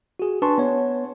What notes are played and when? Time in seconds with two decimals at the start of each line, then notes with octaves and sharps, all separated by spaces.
0.19 F#4 G#4
0.42 D4 B4 G#5 A5 C6 C#6
0.58 B3 C#5